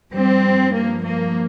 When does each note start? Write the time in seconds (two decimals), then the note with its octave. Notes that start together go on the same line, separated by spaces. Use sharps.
0.13 G2 F3 G3 C4
0.74 A#3
1.04 A#3